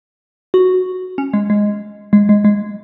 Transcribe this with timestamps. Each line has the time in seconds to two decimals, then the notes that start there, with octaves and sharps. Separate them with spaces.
0.54 F#4
1.18 C#4
1.34 G#3
1.50 G#3
2.13 G#3
2.29 G#3
2.45 G#3